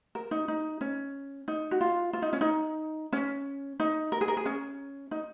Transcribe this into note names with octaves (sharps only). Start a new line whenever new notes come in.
A#4
D#4
D#4
C#4
D#4
F#4
F4
F4
D#4
C#4
D#4
C#4
D#4
A#4
G#4
A#4
G#4
C#4
D#4